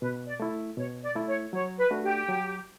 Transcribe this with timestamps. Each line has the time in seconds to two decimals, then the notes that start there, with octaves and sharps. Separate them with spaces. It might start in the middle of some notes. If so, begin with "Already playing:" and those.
0.01 B2 B4
0.27 D5
0.40 A3 E4
0.77 B2 C#5
1.02 D5
1.15 A3 E4
1.27 C#5
1.53 F#3 C#5
1.78 B4
1.91 A3 D4 F#4
2.04 G4
2.29 F#3